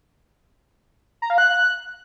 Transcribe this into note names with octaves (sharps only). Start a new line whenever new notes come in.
A#5
F5
F#6